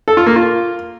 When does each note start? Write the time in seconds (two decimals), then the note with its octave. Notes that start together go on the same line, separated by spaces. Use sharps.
0.08 A4
0.17 F4
0.26 A#3
0.36 F4